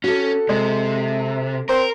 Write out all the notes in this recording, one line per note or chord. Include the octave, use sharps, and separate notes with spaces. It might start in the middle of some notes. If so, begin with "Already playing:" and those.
C#4 F#4 A4
C3 G#3
C4 A#4 C6